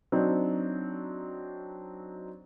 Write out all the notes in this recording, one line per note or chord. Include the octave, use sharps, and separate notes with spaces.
F#3 C4 D4 D#4